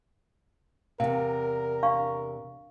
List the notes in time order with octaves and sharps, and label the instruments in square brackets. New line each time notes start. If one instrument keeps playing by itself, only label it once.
[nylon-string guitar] E2 C3 [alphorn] A#4 [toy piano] F5
[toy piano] D4 F5 C#6